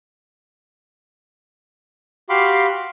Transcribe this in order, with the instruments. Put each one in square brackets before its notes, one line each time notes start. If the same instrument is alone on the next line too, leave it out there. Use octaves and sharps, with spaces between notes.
[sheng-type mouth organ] F#4 G4 F5 B5 C6 D6